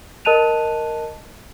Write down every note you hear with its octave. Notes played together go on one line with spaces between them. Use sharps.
A#4 D#5 A5 F#6 D#7 F7